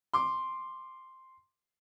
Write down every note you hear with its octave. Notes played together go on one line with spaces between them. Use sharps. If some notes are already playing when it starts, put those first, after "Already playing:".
C6 D6